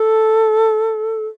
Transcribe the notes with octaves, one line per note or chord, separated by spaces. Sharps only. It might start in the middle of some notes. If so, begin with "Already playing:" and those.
Already playing: A4